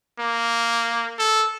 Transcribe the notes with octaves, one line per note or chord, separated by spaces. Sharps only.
A#3
A4